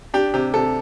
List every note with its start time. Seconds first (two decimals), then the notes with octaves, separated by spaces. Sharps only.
0.14 D4 G4
0.34 C3 G4
0.54 C3 A4